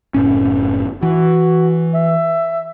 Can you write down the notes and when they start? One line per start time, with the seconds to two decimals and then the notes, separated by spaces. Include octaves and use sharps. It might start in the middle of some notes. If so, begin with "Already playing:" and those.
0.14 F#1 A2 C#4
1.03 E3 F#4
1.95 E5